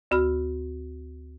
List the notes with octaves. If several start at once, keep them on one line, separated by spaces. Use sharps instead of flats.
D2 F#4 B5 F6